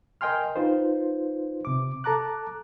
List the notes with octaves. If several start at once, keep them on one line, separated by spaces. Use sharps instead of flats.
A#4 D#5 G5 G#5 C6 F6
D#4 F4 B4 C5
C3 D6
A4 A5 A#5 D6 F#6